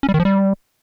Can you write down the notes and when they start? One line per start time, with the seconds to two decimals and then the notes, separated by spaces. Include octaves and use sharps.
0.03 C#4
0.09 G3
0.14 D#3
0.20 F3
0.25 G3